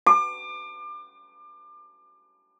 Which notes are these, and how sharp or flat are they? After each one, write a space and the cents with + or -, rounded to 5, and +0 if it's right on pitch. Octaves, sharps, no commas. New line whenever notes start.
D6 +30